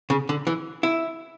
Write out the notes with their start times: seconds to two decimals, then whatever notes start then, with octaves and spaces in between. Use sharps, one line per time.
0.10 C#3
0.29 D3
0.47 E3
0.83 E4